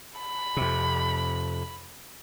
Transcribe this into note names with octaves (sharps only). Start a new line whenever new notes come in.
B5
F2 C3